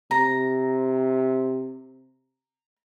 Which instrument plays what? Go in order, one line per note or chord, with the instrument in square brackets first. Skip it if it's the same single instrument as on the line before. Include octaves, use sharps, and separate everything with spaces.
[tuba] C3 [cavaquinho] A#5